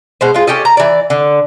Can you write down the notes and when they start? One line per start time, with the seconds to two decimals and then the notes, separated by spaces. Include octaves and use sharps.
0.21 B2 G#3 C5
0.34 G#3 F4
0.47 C#4 G4 A4 D#5
0.65 A#5
0.77 E3 D5
1.10 D3